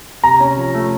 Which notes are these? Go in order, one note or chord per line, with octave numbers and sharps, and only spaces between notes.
C3 A#5
C#4
F3
A3